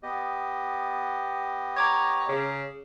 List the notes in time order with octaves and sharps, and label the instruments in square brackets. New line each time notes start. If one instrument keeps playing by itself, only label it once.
[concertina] B3 G4 D#5
[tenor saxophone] C#5 [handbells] A#5 D6 G#6
[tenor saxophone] C#3